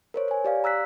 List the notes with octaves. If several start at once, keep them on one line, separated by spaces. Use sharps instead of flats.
A#4 C5 C#5
C#5 G#5
G4 D5 F5
A#5 E6 F#6 B6